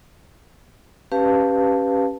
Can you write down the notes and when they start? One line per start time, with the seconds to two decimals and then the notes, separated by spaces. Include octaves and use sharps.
1.12 C#4 G4 B4 F5 A5